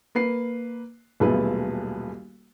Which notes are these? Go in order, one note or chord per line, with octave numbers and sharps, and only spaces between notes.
A#3 B4 C7
D#1 B1 A3 G#4 A4 B4